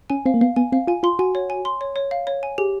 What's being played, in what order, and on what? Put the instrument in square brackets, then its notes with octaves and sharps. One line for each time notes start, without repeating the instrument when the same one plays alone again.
[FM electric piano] C#4 [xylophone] G#5
[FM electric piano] C4 [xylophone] F5
[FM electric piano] A#3
[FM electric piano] B3 [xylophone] F5
[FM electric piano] B3 [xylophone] G#5
[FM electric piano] C4 [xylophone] F5
[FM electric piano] F4 [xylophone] G#5
[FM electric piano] F4 [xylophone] C6
[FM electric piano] F#4 [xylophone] G#5
[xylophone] C#5
G#5
C6
C#5
C#5
F5
C#5
G#5
[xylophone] G4 [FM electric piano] G#4